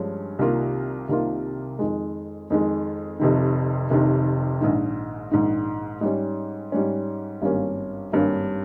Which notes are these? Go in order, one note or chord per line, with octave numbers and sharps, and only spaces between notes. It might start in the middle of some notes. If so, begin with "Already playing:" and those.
Already playing: G2 F3 G#3 C#4
C2 C3 D#3 A#3 F4
C2 C3 D#3 A#3 F4
F2 D#3 G#3
F2 D#3 G#3
F1 F2 C3 D#3
F1 F2 C3 D#3
A#1 G#2 D#3
A#1 G#2 D#3
G#2 G3 C#4
G#2 G3 C#4
G#1 G2 G3 A#3 C#4
G#1 G2 G3 A#3 C#4